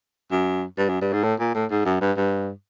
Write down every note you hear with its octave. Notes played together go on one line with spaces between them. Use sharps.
F#2
G2
F#2
G2
G#2
A2
A#2
A2
G#2
F#2
G2
G2